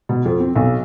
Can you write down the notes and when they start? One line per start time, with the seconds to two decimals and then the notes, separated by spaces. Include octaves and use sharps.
0.09 B2
0.26 F2
0.40 C4
0.56 B1